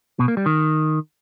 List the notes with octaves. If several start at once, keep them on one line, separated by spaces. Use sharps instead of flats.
B2
A#3
G3
D#3